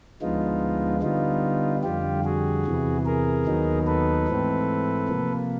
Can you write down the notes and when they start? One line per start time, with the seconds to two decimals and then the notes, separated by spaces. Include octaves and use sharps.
0.22 D2 D3 F3 G#3 B3 D#4 F4
1.02 D3 G3 B3 D#4 F4
1.84 F2 D3 G3 F4 G4
2.24 F#4 G#4
2.66 E2 C3 E3
3.06 G#4 A#4
3.46 D#2 D#3 F#3 B3 D#4
3.87 A4 B4
4.28 G#2 E3 A3 C4
5.08 C3 F3 A#3